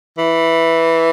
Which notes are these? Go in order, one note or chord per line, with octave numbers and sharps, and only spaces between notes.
E3